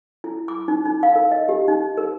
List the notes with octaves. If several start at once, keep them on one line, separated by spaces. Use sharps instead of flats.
E4
D6
D#4
D#4
F5
A#4
D#5
G4
D#4
A#4